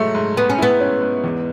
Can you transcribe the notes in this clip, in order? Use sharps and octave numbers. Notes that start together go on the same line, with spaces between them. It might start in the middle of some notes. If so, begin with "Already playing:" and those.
Already playing: G#2 F#3 A3
G#2
G#3 B3
C#4
B3 E4
C#4
G#2
E2